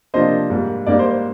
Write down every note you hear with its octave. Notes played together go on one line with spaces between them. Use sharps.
C3 F3 A#3 D4 C5 D#5
G#2 G3 A#3
G#2 G3 A#3 D#4 D5
C5
C5